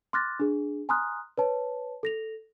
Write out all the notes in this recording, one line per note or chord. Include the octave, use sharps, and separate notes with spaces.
C6 D6 F6 F#6 A6 A#6
D4 G#4
G#5 A#5 C6 D#6 F6 F#6
B4 C#5 A5
A4 A#6 F7